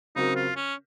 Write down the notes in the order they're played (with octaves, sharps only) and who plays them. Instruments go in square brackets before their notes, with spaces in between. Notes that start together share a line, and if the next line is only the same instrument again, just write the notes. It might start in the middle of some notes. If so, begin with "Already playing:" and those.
[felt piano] C#3 F#3 C4 F#4 A#4 [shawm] D#4
[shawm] F4
C#4